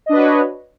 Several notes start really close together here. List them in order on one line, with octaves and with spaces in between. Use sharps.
D#5 D4 B4 F#4 C#5